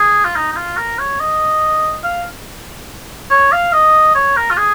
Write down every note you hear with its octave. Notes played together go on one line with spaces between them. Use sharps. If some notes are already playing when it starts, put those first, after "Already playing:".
Already playing: G#4
F4
D#4
D#4
F4
A#4
C#5
D#5
F5
C#5
F5
D#5
C#5
A#4
F4
G#4